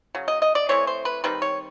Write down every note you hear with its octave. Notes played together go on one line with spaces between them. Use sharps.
C#3 F#3
D#5
D#5
D5
E3 A3 C4 C#5
C5
B4
D#3 G3 C4 D#4 B4
C#5